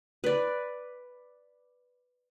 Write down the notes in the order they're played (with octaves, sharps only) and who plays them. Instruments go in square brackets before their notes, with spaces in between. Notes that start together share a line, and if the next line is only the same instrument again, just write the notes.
[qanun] B4 D5